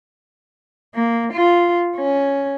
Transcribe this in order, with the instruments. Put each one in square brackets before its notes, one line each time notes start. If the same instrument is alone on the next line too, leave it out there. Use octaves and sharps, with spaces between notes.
[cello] A#3
F4
C#4